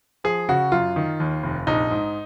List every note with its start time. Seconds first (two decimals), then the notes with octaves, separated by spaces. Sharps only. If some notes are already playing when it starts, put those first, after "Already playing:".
0.24 F3 G#4
0.49 C#3 F#4
0.72 F#2 F4
0.96 D#3
1.20 D#2
1.43 F1
1.67 A#1 D#4
1.91 G#2